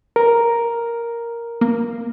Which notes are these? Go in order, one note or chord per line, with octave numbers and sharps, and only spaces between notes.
A#4
A#3